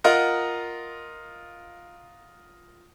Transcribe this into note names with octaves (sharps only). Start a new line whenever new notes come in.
F4 A#4 D#5 F#5 A#5 D#6